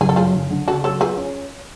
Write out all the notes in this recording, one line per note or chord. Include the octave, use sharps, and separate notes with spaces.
F#1 G#4
A4
F#2 F4 G#4
F#1
D3
C#3 F#4 A4
F#3 A4 C#5
F4 G#4 B4
C#4